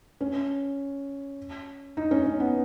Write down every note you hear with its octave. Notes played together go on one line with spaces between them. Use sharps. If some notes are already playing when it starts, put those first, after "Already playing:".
C#4
D#4
C#4
C#4
B3